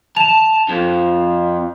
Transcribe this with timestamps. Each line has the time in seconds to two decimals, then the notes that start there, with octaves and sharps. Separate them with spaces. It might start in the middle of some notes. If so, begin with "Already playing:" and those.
0.17 A5 E7 F7
0.69 F2